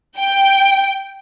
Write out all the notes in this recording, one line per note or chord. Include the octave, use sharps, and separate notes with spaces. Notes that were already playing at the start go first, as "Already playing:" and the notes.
G5